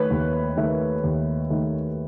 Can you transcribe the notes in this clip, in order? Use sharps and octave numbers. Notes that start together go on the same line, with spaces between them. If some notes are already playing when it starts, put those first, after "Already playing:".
Already playing: D#3 A3 B4 C#5
D#2
D#3 A3
D#2
D#3 A3